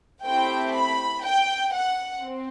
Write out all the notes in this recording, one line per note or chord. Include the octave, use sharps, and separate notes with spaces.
A3 C4 E4 G4 G5
B5
G5
F#5
C4